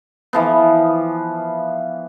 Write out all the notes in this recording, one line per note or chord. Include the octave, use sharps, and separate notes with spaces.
E3 F3 B3